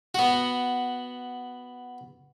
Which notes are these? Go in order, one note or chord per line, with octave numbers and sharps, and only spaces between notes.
B3 F#4